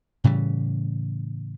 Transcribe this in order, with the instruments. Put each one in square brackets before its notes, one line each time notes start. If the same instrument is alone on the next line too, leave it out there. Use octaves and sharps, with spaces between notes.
[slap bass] A2 C#3 E3 G3